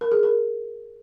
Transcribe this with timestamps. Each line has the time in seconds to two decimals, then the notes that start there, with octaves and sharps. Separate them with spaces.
0.01 A#4
0.12 G#4
0.23 A#4